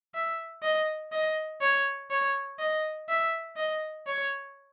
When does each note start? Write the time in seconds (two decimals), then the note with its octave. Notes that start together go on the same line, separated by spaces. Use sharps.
0.15 E5
0.63 D#5
1.12 D#5
1.61 C#5
2.11 C#5
2.59 D#5
3.09 E5
3.57 D#5
4.07 C#5